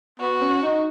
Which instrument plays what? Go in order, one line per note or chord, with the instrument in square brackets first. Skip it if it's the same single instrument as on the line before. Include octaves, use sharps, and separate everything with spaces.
[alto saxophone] B3 [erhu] F#4
[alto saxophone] C#4
D#4